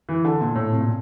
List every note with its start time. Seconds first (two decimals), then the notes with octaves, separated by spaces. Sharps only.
0.09 E3
0.25 D3
0.41 A#2
0.55 A2
0.71 C3
0.80 A#2